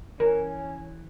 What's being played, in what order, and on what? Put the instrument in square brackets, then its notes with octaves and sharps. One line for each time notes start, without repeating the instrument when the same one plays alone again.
[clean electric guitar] E3 [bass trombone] C#4 [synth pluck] A#4